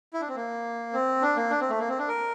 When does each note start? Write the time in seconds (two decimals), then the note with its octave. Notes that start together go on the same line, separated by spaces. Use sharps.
0.14 E4
0.21 D4
0.28 C4
0.36 A#3
0.93 C4
1.22 D4
1.36 A#3
1.50 D4
1.61 C4
1.70 A3
1.79 A#3
1.88 C4
1.99 D4
2.08 A#4